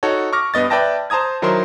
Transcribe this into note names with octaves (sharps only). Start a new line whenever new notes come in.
D#4 F#4 A4 C#5
C#6 D6 F6 A#6
G2 B3 D#5 A6
B4 D5 E5 G5 A5 A#6
C5 A5 A#5 D#6 G#6
D#3 F#3 E4 A#4 C5 C6